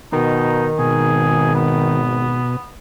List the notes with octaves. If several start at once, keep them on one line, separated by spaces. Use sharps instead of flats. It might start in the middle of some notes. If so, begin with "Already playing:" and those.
B2 D#3 D#4
G#1 B2 G#4
B3